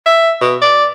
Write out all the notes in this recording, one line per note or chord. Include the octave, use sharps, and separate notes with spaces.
E5
B2
D5